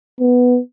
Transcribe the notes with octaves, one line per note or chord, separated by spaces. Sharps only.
B3